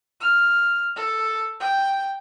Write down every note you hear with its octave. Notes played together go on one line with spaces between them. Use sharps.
F6
A4
G5